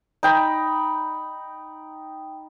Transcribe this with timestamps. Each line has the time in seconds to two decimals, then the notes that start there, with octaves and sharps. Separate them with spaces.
0.23 D#4 G5 B5